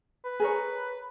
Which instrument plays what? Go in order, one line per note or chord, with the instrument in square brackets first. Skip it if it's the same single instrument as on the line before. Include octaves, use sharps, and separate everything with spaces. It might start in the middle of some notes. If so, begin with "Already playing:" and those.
[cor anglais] B4
[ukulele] G#4 A#4 C#5